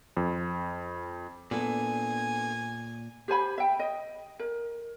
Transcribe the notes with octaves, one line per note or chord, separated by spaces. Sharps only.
F2
A#2 B3 D4 A4 G#5
G4 C5 G#5 B5
E5 G5
D#5
A#4